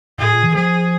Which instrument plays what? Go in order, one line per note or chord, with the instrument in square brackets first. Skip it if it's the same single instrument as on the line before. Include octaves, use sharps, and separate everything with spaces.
[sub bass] A2 [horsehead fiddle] G#4
[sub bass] A#2
E3
[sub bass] F3 [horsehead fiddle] G#4